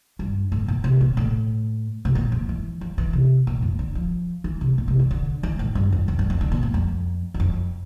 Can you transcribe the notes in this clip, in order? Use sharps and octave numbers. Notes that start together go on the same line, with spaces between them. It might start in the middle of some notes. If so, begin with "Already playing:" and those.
G2
A2
A#2
C3
A#2
A2
C3
A#2
F2
E3
F3
E3
C3
A#2
F2
D3
F3
E3
C3
A#2
C3
D3
D3
E3
A2
G2
E2
F2
G2
F2
D3
A#2
A2
F2
E2
F2